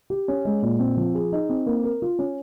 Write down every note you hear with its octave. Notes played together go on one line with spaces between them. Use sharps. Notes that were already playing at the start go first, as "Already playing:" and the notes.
G4
C#4
G#3
A#2
C4
F3
G#4
D#4
C4
A#3
A#4
F4
C#4